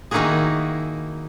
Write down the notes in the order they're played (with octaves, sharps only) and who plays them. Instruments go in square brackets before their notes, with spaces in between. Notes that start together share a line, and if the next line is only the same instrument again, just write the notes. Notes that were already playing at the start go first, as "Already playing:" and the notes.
[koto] D#3 A#3 D#4 E4 F#4 G#4